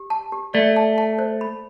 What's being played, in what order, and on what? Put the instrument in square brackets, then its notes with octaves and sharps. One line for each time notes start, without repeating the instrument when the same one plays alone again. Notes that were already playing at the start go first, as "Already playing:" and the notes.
Already playing: [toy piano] G4
A5
G4
[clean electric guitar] A3 [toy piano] D5
[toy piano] A5
A5
C5
B5